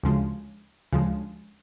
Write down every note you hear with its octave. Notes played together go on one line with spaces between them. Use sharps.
D2 C#3 F3 G#3
D2 C#3 F3 G#3